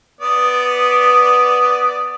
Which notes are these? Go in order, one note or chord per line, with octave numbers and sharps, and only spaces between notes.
B3 D5 D#6